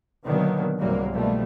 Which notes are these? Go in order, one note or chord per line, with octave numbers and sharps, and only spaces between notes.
B2 D3 D#3 F#3 A#3 B3
C2 G#2 C3 F#3 G3 A#3
B2 D#3 F3 G3 A3